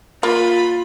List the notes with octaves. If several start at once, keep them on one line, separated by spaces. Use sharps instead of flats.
A#3 F4 B5